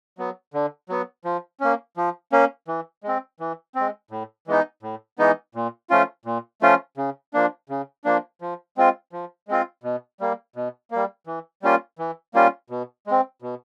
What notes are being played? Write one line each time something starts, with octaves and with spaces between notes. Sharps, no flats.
F#3 B3
D3
F#3 B3
F3
A#3 C#4
F3
A#3 C#4
E3
G#3 C4
E3
C4
G#3
A2
E3 G#3 B3 D#4
A2
E3 G#3 B3 D#4
A#2
F3 A3 C#4 F4
A#2
F3 A3 C#4 F4
C#3
F3 A#3 D4
C#3
F3 A#3 D4
F3
G#3 C4 F4
F3
G#3 C4 F4
B2
G3 A#3
B2
G3 A#3
E3
G3 A#3 C#4 F4
E3
G3 A#3 C#4 F4
B2
G#3 C4
B2